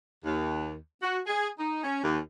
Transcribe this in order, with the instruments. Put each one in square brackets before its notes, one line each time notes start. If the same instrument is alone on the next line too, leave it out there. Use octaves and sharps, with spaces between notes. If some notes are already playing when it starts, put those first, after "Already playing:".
[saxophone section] D#2
F#4
G#4
D#4
C#4
D#2